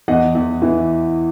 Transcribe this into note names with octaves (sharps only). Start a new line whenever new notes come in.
E2 D#5 F#5
E2
E3